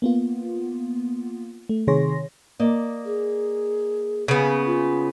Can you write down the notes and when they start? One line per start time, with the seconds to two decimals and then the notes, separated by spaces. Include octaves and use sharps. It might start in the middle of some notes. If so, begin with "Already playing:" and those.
0.02 A#3 B3 F4
1.69 A3
1.87 C3 D#3 G#4 C#5 C6 A#6
2.59 A#3 D5 D#5
3.06 G#4
4.28 C#3 B3
4.66 F4